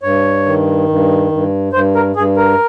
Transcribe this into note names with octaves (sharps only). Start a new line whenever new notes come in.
G2 C#5
D#3
G2
G2
G2 C5
A#4
G2 G#4
A#4